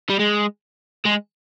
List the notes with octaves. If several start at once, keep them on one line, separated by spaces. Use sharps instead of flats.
G3
G#3
G#3